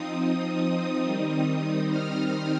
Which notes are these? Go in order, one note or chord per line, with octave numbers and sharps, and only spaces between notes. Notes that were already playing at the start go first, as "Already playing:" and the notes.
Already playing: F3 C4 D#4 D#6
D#3 G3 C4 D#4 D#6
F6